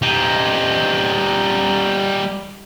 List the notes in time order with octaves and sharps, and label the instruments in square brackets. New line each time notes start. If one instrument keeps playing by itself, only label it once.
[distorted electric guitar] G3 D#4